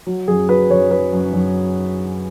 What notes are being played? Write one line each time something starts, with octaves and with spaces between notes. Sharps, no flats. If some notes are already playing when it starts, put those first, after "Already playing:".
F#3
F#2 G#4
F#3 B4
F#2 C#5
F#3 B4
F#2
F#2